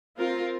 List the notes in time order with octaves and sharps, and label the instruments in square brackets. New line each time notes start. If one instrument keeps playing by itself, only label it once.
[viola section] C4 F4 A#4